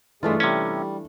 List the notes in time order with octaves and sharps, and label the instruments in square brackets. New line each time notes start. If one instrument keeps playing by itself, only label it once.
[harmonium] G2 G#3 G#4 [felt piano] E3 [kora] A3 D4 F4
[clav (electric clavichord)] C3 C#4 [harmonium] G3